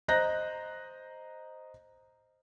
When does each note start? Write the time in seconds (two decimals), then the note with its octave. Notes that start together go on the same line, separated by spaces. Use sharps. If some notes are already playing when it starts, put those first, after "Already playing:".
0.08 C5 D#5 A#5 F#6 G6 A#6